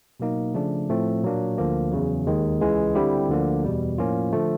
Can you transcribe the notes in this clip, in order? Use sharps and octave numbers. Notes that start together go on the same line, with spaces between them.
B2 F#3 A#3 D#4
C#3 F3 A3 D4
A2 F3 A3 C4
A#2 F#3 A#3 D4
D2 D3 F3 A#3
E2 C#3 F#3
D#2 D#3 G#3
C#2 C#3 E3 G#3
D3 G3 C4 E4 G4
D2 D3 F3 A#3
E2 B2 G3
A2 F3 A#3 C#4 F4
D3 F3 A3